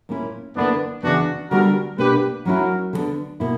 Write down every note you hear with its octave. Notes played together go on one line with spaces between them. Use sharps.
A#2 A#3 C#4 E4
D3 A#3 B3 D4 E4
C#3 E3 B3 D4 F#4
D3 G3 B3 D4 F#4 A#4
B2 A#3 D4 G4 B4
F#3 C#4 E4 F#4 A#4
D3 G3 B3 D4
B2 A#3 E4